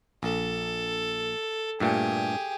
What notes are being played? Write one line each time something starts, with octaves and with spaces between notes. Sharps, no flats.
A#1 A4
G2 A#2 A3 G4 G#4